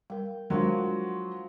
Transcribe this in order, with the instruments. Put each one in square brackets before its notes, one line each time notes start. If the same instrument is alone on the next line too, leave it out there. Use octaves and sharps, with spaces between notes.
[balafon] G3 A#4 [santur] G5
[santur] F3 F#4 C5 [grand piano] F#3 [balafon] G#3 D4 A#4